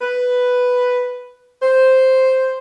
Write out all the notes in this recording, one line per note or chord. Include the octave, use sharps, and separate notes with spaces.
B4
C5